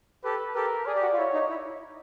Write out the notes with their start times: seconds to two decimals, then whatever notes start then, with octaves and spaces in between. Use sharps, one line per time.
0.24 G4 A4 B4
0.55 G4 A4 A#4
0.86 G#4 D5
0.95 G4
1.02 F#4
1.12 F4
1.18 E4 C#5
1.33 D#4
1.49 E4